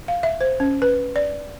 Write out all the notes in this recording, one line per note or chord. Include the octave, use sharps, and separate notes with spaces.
F5
E5
C5
C#4
B4
D5